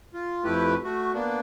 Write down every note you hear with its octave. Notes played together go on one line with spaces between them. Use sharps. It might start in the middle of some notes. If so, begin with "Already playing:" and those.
F4
F2 A3 E4 G4 B4
A3 F#4
A#3 B3 D4